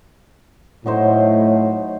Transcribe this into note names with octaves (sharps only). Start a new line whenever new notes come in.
A2 F#3 D#4 C5